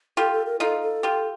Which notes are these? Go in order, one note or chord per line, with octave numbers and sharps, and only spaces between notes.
F4 G4 A4
A4
A#4
D#4 F4 A4
A4
F4 G4